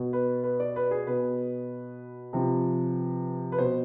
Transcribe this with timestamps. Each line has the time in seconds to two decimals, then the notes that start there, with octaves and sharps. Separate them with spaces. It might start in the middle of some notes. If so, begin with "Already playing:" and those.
Already playing: B2
0.13 B4
0.44 B4
0.60 D5
0.76 B4
0.91 G#4
1.07 B2 B4
2.33 C3 F3
3.52 B4
3.58 B2 C5